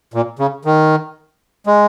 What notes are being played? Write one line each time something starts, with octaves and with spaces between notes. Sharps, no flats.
A#2
C#3
D#3
G#3